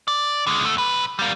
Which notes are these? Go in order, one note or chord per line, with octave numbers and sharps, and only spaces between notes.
D5
D3 G#3
D2 A3
B1 B4
G3 A#3